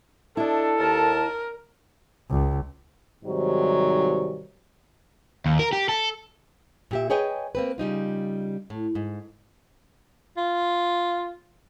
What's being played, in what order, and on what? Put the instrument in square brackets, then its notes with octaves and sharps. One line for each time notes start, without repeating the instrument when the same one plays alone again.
[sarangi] D4 [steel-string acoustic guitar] E4 D#5 [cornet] A4
[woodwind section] D#2 A5 [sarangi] A#4
[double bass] C#2
[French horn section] G#2 C3 D#3 F#3 G3
[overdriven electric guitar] D#2
A#4
G4
A4
[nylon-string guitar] A#2 G4 E5
G#4 B4 C#5 D#5 G5 G#5
A#3 C4 B4
C#3 G3 D#4 F4
A2
G#2
[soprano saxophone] F4